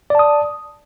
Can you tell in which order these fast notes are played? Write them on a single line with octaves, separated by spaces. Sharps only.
D5 A5 D#6